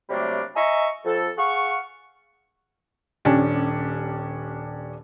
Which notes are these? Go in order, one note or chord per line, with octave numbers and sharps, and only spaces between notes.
C3 F#3 G3 A3 A#3 D4
D#5 E5 G#5 A#5 C#6
F2 A4
G#4 F5 F#5 C#6
D#1 C#4 D4 G4